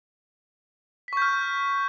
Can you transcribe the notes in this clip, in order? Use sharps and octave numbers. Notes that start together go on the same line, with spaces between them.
C#6 F6 G6 B6